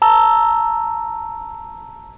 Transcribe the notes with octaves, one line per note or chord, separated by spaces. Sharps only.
A5 A#5 E6